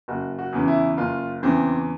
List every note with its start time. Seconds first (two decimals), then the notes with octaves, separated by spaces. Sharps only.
0.08 F#1 F#4
0.39 F#4
0.53 E2 C#3 E3
0.68 E4
0.97 F#1 F4
1.43 E2 C#3 E3 C4